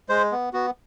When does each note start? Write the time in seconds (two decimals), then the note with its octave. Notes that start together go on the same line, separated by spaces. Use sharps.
0.09 G#3 C5
0.32 B3
0.53 B3 F#4